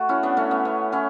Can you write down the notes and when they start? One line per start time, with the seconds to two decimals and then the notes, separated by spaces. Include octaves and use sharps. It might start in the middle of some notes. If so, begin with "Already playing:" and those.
Already playing: A3 F#4
0.09 C#4 E4
0.23 B3 D4
0.37 A3 C#4
0.51 B3
0.65 B3
0.92 C#4 E4